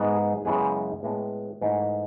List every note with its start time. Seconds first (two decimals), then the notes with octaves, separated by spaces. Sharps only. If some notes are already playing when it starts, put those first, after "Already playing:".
Already playing: G#2 G#3 B3
0.16 G#4
0.45 F#2 C#3 E3 G#3 B3 G#4
1.03 A2 G#3 B3
1.61 G#2 E3 A3